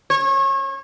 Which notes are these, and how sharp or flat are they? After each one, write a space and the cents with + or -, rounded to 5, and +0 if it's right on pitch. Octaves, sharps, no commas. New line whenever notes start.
C#5 -30